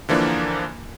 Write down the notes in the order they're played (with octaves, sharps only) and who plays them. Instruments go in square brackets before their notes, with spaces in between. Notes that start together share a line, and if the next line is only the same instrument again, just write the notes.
[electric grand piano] D3 E3 F3 A#3 D4